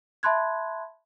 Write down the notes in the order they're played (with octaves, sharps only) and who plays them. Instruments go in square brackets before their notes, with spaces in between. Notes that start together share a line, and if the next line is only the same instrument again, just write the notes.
[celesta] E5 A5 B5 C6 F#6 G#6